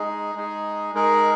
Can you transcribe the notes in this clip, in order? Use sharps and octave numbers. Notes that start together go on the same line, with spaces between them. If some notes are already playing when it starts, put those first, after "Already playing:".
Already playing: G#3 D#4 G#4
G#3 D#4 G#4
G#3 D#4 G#4 A#4